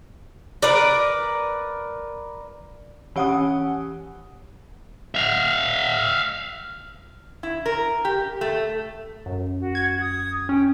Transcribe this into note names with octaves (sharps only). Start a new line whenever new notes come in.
A#4 B4 D5
E3 C#4 G4 F#5 G#5 D#6
E5 F5
E4
A#4
G4
A3
F#2
F#4
G#6
D#6
C#4 G5